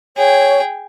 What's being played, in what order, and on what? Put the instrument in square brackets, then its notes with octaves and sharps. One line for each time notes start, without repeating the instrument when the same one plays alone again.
[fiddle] G#4 G5 [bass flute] C#5